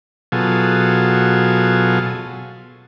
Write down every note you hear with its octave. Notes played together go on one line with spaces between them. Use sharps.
B2 F#3 F4 G#4 A4